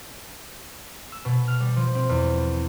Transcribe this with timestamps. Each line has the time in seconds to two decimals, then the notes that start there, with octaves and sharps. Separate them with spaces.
1.12 E6
1.25 B2
1.48 F6
1.60 G3
1.76 F3
1.95 C4
2.09 E2